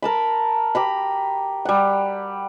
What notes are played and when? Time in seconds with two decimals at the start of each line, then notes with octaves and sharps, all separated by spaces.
0.02 A#4 A5 B5
0.75 G4 A#5 B5
1.65 G3 F#5